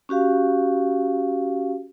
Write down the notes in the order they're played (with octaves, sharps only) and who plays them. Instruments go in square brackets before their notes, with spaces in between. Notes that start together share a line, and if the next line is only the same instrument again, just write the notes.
[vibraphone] C#4 F#4 G4 F5